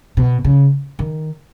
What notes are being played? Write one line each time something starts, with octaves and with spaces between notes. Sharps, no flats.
B2
C#3
D#3